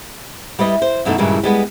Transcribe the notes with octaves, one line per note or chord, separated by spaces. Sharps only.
G3 E4 B4 D#5
C5
F#2 B2 E3 A3 C4 D#4
G2 A#2 C#3 E3 G3 G#3
G3 G#3 B3